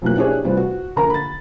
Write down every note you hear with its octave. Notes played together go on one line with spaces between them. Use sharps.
B1 F2 B2 E3 A#3 F#6
D4 E4 G4 G#4 C#5
C3 E3 G3 C4 F4 B4
F#4
A#1 D3 A#4 A#5
B5 A6